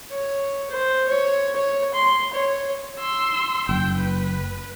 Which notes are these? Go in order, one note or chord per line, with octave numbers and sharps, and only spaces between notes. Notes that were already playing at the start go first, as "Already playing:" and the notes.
C#5
C5
C#5
C#5
C6
C#5
C6 E6
F#1 G5
B4